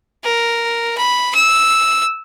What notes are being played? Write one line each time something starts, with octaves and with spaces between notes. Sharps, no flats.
A#4
B5
E6